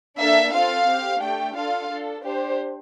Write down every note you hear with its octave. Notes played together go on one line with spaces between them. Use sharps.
A#3 D4 A4 E5
C4 F4 A4 F5
C4 G4
A3 D4 G4 G5
D4 F4 A4 F5
D4 A4
D4 G4 C5